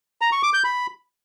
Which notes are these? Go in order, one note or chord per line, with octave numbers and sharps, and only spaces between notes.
A#5
C#6
D6
G6
B5